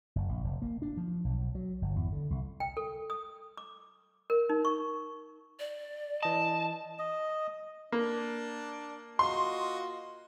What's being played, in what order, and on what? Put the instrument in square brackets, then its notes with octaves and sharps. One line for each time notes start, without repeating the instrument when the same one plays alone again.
[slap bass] F#1
A#1
F1
A#3
D4
F3
B1
F#3
G1
E2
D3
C2
[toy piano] G5
A4
D#6
D6
A#4
D#4
C#6
[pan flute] D5
[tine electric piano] E3 D#5 [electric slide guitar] A5
[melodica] D#5
[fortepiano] A#3 [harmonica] D4
[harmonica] F4 F#4 D#5 [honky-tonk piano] C6